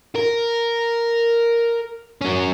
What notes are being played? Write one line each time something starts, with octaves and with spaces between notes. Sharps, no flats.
A#4
F#3 C#4